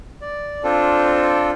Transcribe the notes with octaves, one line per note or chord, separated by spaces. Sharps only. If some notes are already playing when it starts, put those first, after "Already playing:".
D5
C4 D4 F4 A4